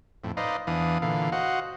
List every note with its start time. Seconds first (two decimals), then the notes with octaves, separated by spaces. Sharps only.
0.24 F2 A2
0.37 D#4 B4 C5 D5 D#5 F5
0.67 E2 E3 D4 F5 D#6
1.02 A#2 D3 E3 F5
1.32 F#4 C5 D#5 F5 F#5